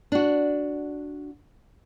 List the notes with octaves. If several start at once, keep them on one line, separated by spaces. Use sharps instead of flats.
D4 F#4